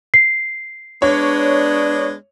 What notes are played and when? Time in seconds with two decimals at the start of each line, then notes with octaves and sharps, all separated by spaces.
0.14 C7
1.02 G#3 B3 D4 C#5